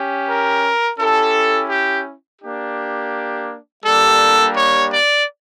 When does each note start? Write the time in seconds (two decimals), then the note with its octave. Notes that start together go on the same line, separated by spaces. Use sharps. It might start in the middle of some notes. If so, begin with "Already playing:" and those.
Already playing: C#4 G4
0.27 A#4
0.99 C#4 E4 G4 A4
1.70 G4
2.41 A#3 D4 G4
3.84 G3 A#3 D4 G4 A4
4.56 C#5
4.92 D5